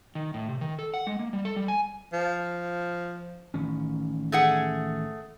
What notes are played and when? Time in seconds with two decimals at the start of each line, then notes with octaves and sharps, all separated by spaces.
0.15 D#3
0.34 A2
0.49 C3
0.61 D#3
0.79 A4
0.94 F#5
1.07 G#3
1.19 A#3
1.33 G3
1.45 A4
1.56 G3
1.68 G#5
2.13 F3
3.54 A1 D#3 C#4
4.32 A3 G#4 F#5